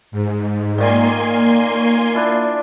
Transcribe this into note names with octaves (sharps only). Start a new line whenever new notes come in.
G#2
A#2 D#3 A#3 G#5 C6
C#5
D4 E4 F4